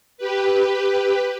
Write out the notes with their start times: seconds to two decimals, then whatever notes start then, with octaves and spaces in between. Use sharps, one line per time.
0.18 G4 B4